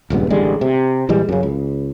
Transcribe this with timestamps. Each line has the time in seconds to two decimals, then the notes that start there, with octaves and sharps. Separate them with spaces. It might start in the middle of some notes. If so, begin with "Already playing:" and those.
0.10 D#1 C#2 G2 B3
0.30 A1 D3 G3 G#3
0.61 C3
1.09 A#1 E3 G3 G#3
1.29 F#2 C#3
1.43 C#2